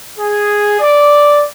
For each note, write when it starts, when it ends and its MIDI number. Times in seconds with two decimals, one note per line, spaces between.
0.19 0.79 68
0.80 1.44 74